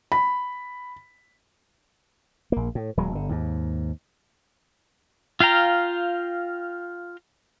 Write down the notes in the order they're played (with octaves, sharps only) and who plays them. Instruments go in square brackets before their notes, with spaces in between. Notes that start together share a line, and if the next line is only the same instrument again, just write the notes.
[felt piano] B5
[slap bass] A#1 A#3
A2
D#1 F#3 G#3
G1 D3
D#2 G#2
[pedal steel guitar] F4 F5 G5 A#5